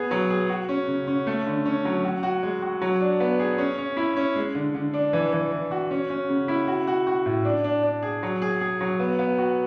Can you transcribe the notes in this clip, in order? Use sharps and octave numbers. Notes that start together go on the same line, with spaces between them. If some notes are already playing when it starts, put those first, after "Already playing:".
Already playing: B3 G#4
F#3
G#4
F#4
C#4
C#3
C#4
A3
D3
C#4
F#3
F#4
F#4
G#3
F#4
F#3
D4
B3
G#4
C#4
C#4
E4
C#4
G#3
D3
D3
D4
E3
E3
E3
F#4
C#4
C#4
C#3
E4
F#4
F#4
F#4
A2
D4
D4
D4
G#4
F#3
G#4
G#4
F#3
B3
B3
F#4